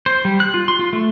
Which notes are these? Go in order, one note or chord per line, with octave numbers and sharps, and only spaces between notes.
C5
G3
F#6
F4
C6
F4
A3